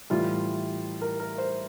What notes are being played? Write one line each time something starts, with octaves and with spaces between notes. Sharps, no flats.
A2 E3 G3 F4
A#4
A#4
C5